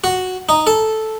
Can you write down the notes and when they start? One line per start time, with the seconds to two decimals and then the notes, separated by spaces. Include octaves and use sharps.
0.04 F#4
0.49 D#4
0.67 A4